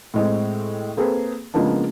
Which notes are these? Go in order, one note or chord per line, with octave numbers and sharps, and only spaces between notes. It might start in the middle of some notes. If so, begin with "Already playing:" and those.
A2 G#3 C4
A#3 C4 G#4 A4 B4
C#3 F3 G#3 A#3 B3 D4